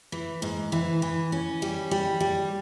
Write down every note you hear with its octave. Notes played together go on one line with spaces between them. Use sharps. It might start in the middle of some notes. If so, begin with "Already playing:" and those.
E3
G#2
E3
E3
C#4
G3
G3
G3